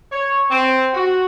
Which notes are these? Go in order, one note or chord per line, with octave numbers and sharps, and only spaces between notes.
C#5
C4
F#4